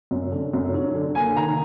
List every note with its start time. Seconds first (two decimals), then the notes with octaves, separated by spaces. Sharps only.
0.11 F#2
0.32 D3
0.53 F#2
0.74 F#3
0.95 D3
1.15 A#3 G#5
1.37 D#3 A#5